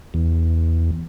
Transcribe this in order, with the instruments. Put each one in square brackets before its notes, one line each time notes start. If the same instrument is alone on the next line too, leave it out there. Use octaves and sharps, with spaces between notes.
[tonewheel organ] E2